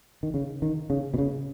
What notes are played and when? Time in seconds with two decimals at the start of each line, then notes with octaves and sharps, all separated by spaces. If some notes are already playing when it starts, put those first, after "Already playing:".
0.23 D#3
0.34 C#3
0.62 D#3
0.90 C#3
1.14 B2
1.18 C#3